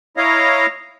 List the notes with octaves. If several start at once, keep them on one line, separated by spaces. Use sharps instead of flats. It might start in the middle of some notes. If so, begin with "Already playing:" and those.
E4 C#5 D#5 F5 A#5